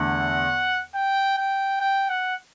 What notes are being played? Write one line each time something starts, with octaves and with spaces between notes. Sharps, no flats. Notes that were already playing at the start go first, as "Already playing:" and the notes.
Already playing: E2 D3 A3 F#5
G5
G5
G5
F#5